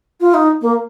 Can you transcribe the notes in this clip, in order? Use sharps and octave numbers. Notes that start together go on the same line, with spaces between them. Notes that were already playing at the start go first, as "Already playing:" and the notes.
F4
D#4
A#3